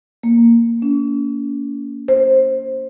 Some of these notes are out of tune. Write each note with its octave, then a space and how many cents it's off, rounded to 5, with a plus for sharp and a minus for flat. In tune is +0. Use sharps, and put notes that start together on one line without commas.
A#3 -5
C#4 +40
C5 +15